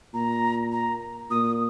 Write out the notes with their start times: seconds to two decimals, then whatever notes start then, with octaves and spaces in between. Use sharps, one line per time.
0.14 A#2 A#5
0.72 A#5
1.30 A#2 D#6